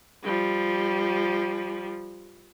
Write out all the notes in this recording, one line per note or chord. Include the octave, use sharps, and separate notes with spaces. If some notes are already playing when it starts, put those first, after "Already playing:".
F3 G3